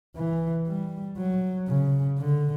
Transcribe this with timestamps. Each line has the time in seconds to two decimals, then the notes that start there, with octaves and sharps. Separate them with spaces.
0.16 E3
0.67 G3
1.17 F#3
1.68 C#3
2.19 D3